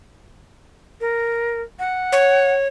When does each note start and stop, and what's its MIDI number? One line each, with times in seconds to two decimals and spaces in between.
1.01 1.62 70
1.79 2.52 78
2.12 2.68 73